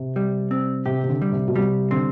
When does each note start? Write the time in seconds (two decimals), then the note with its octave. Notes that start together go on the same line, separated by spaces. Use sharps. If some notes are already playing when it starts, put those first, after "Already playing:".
Already playing: C3
0.16 G3
0.51 C4
0.86 C3 G4
1.04 C3
1.09 D3
1.22 G3
1.32 C3
1.48 B2
1.56 C3 G3
1.91 D3 C4